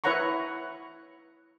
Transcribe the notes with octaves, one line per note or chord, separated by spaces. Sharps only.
E4 B4 C#5 F#5 A#5 C#6